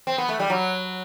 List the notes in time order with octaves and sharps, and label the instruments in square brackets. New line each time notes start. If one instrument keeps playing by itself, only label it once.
[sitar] C4
B3
A3
G3
F#3